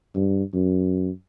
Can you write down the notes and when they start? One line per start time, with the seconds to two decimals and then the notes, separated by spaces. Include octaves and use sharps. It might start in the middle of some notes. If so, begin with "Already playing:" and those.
0.15 G2
0.54 F#2